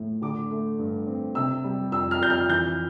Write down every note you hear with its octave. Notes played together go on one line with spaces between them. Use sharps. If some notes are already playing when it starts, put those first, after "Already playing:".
Already playing: A2
D3 D6
A3
G2
C4
C3 E6
G3
F2 E6
F6
F2 G6
F6
E3 G6